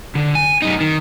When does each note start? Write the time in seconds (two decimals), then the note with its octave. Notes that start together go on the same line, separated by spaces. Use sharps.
0.15 D3
0.35 G#5
0.62 F#2 D#4
0.81 D#3